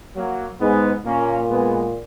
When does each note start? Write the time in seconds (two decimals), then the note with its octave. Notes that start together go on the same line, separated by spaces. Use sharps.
0.16 F#3 A#3
0.61 G#2 G#3 B3
1.05 A#2 A#3 C#4
1.50 G#3 B3